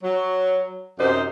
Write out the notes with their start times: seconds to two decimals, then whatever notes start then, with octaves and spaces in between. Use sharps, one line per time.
0.03 F#3
0.98 F#2 C3 D#4 C5